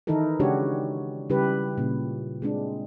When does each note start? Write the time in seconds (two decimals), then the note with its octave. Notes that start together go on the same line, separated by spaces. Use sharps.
0.07 D#3 E3 D#4 E4 A4 A#4
0.40 C#3 G#3 D4 F#4 G4 C#5
1.30 C#3 G3 E4 G4 B4
1.78 A#2 C#3
2.42 G#3 C4 D4